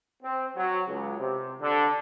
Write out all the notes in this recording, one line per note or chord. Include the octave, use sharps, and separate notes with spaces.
C4
F#3
C#2
C3
D3